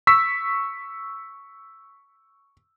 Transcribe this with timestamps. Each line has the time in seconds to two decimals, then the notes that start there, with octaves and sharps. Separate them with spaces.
0.07 C#6 E6 B6